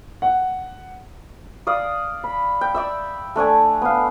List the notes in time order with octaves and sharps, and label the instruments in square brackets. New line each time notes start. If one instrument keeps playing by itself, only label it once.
[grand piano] F#5
[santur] D5 F5 D#6
B5
G5
D5 E5 E6
A3 D4 D5 G#5
B3 F5